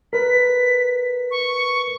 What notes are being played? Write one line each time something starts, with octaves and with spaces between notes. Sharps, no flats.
A#4 B4 B6
C#6